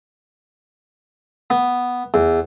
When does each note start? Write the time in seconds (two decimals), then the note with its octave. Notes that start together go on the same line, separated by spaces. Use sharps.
1.50 B3
2.14 E2